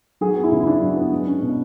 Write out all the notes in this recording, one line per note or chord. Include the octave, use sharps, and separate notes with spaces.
F#3 G#4
B3
E4
C#3
E4
D4
F#3
B3
G#3
C#4
B2